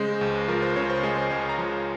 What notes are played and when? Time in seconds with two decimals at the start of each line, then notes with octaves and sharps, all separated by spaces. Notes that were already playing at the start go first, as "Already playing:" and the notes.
Already playing: C#3 G#3 C5
0.21 C#2
0.48 F3 A#4
0.62 C5
0.76 C#3 C#5
0.90 C5
1.03 G#3 G#4
1.17 C5
1.31 C#2 C#5
1.49 A#5
1.58 F3